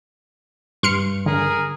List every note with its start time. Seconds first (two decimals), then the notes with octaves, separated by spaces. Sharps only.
0.83 G2 C6 F6 C#7
1.26 D3 G#4 A#4